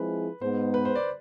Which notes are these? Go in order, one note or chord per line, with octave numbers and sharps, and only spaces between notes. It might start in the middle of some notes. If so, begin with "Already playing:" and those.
Already playing: F3 G#3 C4 E4 G#4 B4
G#2 G#3 B3 C5
B4
C5
D5